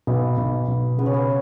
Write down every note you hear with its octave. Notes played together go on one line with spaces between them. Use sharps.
B1 B3
B1
B1
C#3 B3
C#4
B3